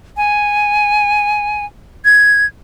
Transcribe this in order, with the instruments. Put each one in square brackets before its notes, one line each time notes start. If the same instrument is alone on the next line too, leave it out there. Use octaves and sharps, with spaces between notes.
[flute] G#5
G#6